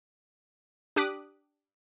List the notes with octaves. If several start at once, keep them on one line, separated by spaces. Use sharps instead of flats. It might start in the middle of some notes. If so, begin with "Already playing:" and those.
D4 G4 D6 D#6 F#6 B6